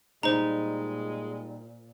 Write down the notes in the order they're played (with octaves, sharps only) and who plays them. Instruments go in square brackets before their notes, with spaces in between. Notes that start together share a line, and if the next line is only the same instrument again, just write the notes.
[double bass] A#2 [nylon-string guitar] G3 D#4 [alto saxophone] G#3 [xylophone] C5 A#5